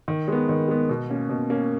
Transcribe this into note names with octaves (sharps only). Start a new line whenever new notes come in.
D#3
G#3 B3
D#3
G#3 B3
B2
A#3 C#4
B2
A#3 C#4